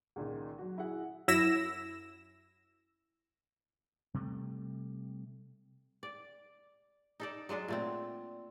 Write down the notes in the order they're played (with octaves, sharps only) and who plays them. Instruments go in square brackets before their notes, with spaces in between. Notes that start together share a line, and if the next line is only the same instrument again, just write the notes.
[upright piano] C#2 A#2 D#3
F#3 F#4
E4 F#4 G#4 F#5
[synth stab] F#2 E4 E6 A#6 E7
[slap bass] C3 G3 A3
[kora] D5
D#4 A4 D5
F#3 G#3 D4 A4
A#2 A3 C4